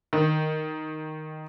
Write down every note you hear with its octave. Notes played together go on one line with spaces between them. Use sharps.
D#3